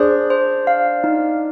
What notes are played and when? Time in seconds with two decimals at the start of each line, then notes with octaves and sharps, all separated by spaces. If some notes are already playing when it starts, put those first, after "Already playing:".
Already playing: D4 G#4 C5
0.30 C5
0.67 F5
1.04 D#4